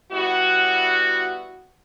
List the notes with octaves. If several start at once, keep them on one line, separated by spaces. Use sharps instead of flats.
G3 B3 E4 F#4